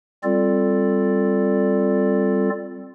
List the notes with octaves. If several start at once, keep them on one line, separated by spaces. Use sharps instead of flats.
G3 C4 F4 A4 D5